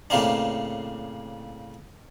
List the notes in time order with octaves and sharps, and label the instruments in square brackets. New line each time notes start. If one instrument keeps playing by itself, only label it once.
[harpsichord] A2 C#3 A#3 C4 D4